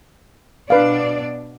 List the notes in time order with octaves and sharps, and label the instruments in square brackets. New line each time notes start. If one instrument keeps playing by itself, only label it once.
[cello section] B2 D4 D5 [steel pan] B4 F5